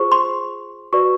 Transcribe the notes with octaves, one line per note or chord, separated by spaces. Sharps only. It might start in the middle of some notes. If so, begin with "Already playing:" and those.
Already playing: F4 G#4 C5 C#6
C6
F#4 B4 D5 C#6